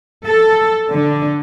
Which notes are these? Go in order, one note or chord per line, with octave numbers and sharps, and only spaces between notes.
A4
D3